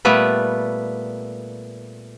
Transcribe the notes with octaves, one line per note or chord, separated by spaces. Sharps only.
A#2 G3 A3 B3 B4